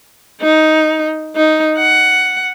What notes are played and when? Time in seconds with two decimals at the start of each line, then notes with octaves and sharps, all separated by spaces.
0.41 D#4
1.36 D#4
1.78 F#5